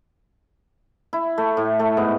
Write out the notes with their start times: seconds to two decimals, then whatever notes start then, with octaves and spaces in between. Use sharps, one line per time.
1.13 E4
1.38 A3
1.57 A2
1.79 A3
1.97 G#2 B3